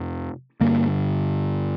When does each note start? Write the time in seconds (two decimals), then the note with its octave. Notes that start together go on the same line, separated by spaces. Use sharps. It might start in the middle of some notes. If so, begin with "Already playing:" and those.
Already playing: F2 C3
0.61 G2 D3 A#3